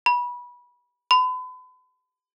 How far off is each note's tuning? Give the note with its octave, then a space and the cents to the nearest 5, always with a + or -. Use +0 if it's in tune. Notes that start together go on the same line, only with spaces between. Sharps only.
B5 -20
B5 +40